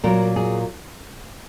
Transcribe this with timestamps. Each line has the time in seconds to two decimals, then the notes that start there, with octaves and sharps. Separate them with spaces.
0.04 A#2 F#3 A#4
0.36 G#4